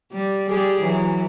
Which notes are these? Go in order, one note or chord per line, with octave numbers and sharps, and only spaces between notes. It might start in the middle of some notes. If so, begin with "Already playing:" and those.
G3
G3 G4 G#4
E3 F#3